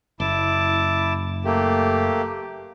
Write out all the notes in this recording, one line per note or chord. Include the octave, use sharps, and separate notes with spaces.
F#1 E4 A5 D6
A3 A#3 G4